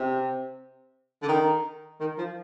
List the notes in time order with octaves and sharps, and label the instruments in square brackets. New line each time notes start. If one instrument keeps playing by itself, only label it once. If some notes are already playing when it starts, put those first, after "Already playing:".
Already playing: [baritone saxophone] C3
D3
D#3
D#3
F3